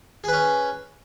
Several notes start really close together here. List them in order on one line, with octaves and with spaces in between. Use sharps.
G#4 B4 C#4